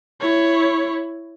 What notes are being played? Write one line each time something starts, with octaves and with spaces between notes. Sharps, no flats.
E4 C#5